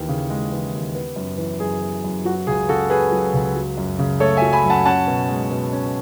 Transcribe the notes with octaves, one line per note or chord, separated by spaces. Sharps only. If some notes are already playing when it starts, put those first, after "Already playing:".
Already playing: D#2 E3
C#3
G#3
E3
D#2
B3
F#2
E3
F#2 G#4
B3
F#2
F#3 F#4
C#2 G#4
C#3 F#4 A4
C#4 G#4 B4
F#3
C#2
F#3
F#2
C#3
A3 A4 C#5
E5 G#5
F#3
G#5 B5
F#2
F#5 A5
C#4 F#5 A5
B2
G#3
B2
C#4